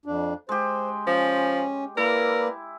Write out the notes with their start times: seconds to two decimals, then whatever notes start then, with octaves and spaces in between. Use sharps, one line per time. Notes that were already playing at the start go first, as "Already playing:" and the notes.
0.06 F2 D4
0.49 G#3 G4 C5
1.07 F3 C#4
1.97 A#3 E4 A#4 B4 D5